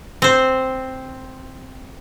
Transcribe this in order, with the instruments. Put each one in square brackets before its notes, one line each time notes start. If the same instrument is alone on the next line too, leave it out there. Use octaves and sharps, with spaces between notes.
[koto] C4 C5